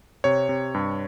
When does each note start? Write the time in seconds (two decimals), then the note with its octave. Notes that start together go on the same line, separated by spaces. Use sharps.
0.24 C3 C#5
0.49 C3
0.74 G2